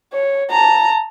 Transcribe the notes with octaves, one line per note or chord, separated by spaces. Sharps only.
C#5
A5 A#5